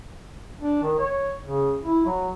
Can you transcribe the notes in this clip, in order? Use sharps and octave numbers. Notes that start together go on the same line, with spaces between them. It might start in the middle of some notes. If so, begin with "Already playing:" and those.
D4
D#3
C#5
C#3
E4
F#3